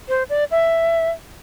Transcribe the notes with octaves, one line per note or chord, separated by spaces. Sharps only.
C5
D5
E5